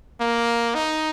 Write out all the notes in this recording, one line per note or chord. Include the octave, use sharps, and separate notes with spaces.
A#3
D#4